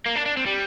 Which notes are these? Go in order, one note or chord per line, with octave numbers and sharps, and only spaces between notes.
A#3
D4
D4
C4
G3